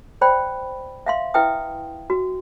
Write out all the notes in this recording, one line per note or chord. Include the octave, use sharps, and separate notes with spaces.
C5 D5 G5 B5
E5 F5 C6
E4 B4 E5 G5 D#6
F#4